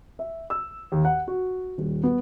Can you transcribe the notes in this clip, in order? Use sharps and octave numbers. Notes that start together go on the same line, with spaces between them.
E5
E6
D#2
F#5
F#4
D#1
B3